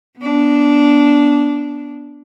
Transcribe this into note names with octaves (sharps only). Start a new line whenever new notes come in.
B3 D4